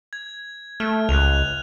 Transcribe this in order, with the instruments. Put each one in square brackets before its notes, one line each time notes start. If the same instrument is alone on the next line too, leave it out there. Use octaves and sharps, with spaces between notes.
[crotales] G#6
[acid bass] A3 [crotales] F6
[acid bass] C#2 [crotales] F#6 F7